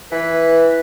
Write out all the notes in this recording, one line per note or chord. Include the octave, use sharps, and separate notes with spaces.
E3 B4